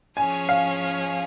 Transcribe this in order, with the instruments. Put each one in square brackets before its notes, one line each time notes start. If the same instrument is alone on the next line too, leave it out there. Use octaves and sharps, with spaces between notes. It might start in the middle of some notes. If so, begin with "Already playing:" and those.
[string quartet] F3 C#4 G#4 C#5 [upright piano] G#5
[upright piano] F5